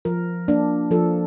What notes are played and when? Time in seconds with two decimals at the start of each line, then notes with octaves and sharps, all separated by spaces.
0.05 F3 A#4
0.48 A#3 D4
0.91 F3 A4